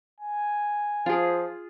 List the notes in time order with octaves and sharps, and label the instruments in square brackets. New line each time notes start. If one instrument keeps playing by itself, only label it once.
[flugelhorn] G#5
[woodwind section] F3 [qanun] F4 G#4